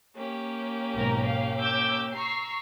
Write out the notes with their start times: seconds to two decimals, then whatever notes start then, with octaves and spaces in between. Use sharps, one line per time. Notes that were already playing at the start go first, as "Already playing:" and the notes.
0.15 A#3 C#4 G4
0.94 B1 G#2 A#4
1.25 F5
1.61 D6 E6 G6
2.14 A#5 C#6 E6 C7